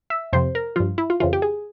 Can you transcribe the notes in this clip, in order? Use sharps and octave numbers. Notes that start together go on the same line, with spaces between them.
E5
F2 C3 F3 C5
A#4
G2 F3 F4
E4
F4
F2 C#3 E3 F4
G4
G#4